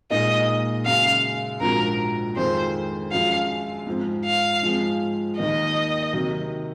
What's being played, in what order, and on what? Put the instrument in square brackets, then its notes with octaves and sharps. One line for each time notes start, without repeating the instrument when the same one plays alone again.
[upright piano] A#2 G#3 D#4 A#4 [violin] D#5
[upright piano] F#2 C#3 G#3 [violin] F5
[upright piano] A#1 G#2 F3 C4 F#4 [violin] A#4
[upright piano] F2 D#3 G#3 C4 F4 [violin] C5
[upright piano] F#2 F3 G#3 C#4 F4 [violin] F5
[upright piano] G#2 F3 C4
[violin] F5
[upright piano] G#2 F3 G#3 C4
[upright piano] D#2 D#3 A#3 [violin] D#5
[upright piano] C3 D#3 F#3